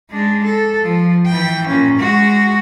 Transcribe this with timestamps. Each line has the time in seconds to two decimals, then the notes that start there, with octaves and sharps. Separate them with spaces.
0.10 G#3 D4
0.44 A4
0.83 F3
1.27 E3 G5
1.67 A#2 C#4
1.97 G#3 F#4